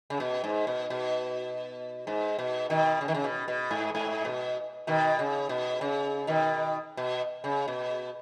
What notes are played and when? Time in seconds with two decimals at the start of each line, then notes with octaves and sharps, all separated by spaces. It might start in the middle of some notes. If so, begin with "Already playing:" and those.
0.10 C#3
0.20 B2
0.44 G#2
0.67 B2
0.90 B2
2.07 G#2
2.39 B2
2.70 B2 D#3
3.01 C#3
3.08 D#3
3.14 C#3
3.24 B2
3.48 B2
3.71 G#2
3.95 G#2
4.25 B2
4.87 B2 D#3
5.19 C#3
5.49 B2
5.81 C#3
6.27 B2 D#3
6.97 B2
7.44 C#3
7.68 B2